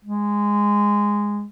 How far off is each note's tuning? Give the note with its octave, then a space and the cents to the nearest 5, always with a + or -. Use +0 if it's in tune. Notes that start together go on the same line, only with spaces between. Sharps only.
G#3 -10